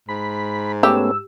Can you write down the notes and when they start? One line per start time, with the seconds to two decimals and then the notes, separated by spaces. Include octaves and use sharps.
0.09 G#2 B5
0.83 A3 B3 C#4 G4 E6